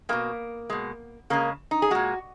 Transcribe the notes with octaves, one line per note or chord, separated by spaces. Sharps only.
B2 G#3 A#3
B2 G#3
C#3 G#3 A#3
D#4
G#4
A#2 G#3 F#4